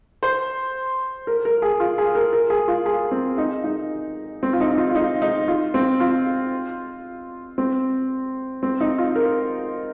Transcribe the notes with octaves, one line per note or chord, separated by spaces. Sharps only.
C5
A#4
A#4
G#4
F4
G#4
A#4
A#4
G#4
F4
G#4
C4
D#4
D#4
C4
F4
D#4
D#4
F4
F4
D#4
D#4
F4
C4
F4
C4
C4
D#4
F4
A#4